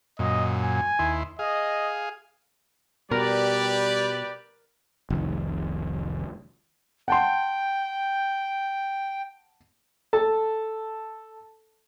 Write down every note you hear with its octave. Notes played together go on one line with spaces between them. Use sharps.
F#2 A#2 D#5
G#5
D#2 E4 C6
G#4 D#5 F5
B2 G3 G4 A#4 B4 D5
F1 C2 D#3
F#5 G5 A5 C6
A4 A5